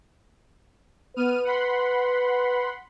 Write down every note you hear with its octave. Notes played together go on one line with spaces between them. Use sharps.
B3 B4 F6 D#7
F#5 B5 C6